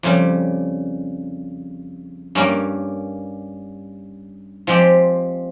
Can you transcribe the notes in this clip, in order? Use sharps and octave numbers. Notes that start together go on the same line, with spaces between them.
F2 C#3 G3
G2 G3 A#3 C#4
F3 G#3 C4 G4